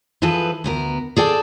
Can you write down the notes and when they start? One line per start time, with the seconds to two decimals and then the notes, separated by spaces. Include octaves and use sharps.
0.22 E3 F3 G#4 A4 B4
0.64 D2 B3 A#4
1.17 G#4 A4 D5 G5